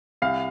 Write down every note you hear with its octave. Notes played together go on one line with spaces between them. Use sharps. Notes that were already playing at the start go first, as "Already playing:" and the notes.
C2 F5